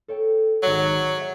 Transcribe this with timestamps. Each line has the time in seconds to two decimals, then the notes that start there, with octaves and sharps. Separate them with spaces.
0.08 A4 C#5 G5
0.63 G#1 F#3 D5
0.83 A#5 A6 B6
1.18 C#5 E5